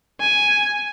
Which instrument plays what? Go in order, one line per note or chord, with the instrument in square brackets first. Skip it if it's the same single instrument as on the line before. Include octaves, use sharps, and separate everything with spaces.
[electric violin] G#5